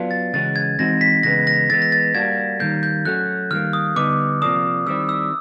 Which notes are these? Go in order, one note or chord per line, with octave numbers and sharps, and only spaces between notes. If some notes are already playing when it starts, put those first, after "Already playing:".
Already playing: F#3 B3 D4 F4
A6
C#3 E3 G#3 C#4 F#4 A6
G#6
E3 G#3 C4 D#4 F#4 A#6
B6
C#3 E3 G#3 B3 A#6
A#6
E3 G#3 B3 A6
A#6
A6
G3 A#3 D4 F#4 G#6
D#3 G3 A#3 G6
G6
F#3 A3 C#4 F#4 F#6
D#3 G3 A#3 F6
D#6
D3 G3 B3 D#4 D6
C3 F3 A#3 D4 D#6
D#3 G3 C4 E4 E6
E6